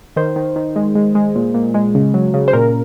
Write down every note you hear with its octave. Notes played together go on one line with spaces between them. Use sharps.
D#3 C5
D#3
D#3
G#3
G#3
G#3
A#2
A#2
G#3
C#3
F#3
C#3
C5
A#2 A#4